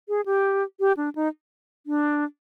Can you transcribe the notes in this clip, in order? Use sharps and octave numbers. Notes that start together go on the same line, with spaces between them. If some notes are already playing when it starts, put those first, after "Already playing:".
G#4
G4
G4
D4
D#4
D4